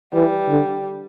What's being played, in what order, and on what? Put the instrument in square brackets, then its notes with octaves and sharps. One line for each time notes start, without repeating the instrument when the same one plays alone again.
[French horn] E3 [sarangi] G3
[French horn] D3